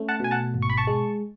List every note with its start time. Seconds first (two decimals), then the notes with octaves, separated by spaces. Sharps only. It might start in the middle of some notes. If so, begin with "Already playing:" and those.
Already playing: A3 C#4
0.09 F#5 A5
0.20 B2 G#5
0.31 F#5 A5
0.54 G#1
0.62 C#6
0.70 B5
0.77 A5 C#6
0.87 G#3